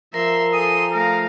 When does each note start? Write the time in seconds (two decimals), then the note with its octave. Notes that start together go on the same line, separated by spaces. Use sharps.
0.14 F3 A#4 E5 A#5 C6 E6
0.53 A4 G#5 C6 D#6
0.93 A3 A#4 F5